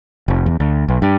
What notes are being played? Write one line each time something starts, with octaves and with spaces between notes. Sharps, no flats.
F1
E2
D2
B1
G2